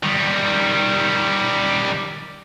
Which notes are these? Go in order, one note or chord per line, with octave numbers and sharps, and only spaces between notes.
D#3 G3